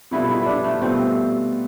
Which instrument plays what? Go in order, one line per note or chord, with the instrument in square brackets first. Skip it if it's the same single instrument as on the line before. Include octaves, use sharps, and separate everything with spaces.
[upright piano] B2 G3 B3 F4 A4 [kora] E4
[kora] E4
D4
A3
[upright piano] B2 G3 B3 F4 A4 [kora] C4